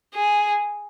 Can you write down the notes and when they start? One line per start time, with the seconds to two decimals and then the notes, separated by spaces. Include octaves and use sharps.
0.15 G#4